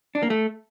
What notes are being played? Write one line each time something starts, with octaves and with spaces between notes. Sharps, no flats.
D4
A#3
A3